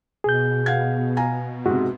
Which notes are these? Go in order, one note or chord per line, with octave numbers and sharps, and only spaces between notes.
B2 G#4 G6
F5 F#5 G#6
F5 G#5 A#5
G#2 C3 F#4